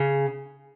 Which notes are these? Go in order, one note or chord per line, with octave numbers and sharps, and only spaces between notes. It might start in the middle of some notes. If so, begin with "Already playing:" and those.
Already playing: C#3